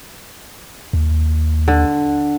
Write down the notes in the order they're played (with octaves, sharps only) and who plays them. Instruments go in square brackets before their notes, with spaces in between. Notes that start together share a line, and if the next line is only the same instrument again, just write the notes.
[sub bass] D#2
[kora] D3